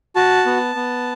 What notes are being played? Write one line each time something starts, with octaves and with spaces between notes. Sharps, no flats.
F#4 A5
B3
B3